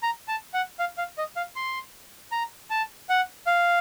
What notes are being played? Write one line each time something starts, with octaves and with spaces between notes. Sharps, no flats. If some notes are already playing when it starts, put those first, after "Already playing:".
A#5
A5
F#5
F5
F5
D#5
F5
C6
A#5
A5
F#5
F5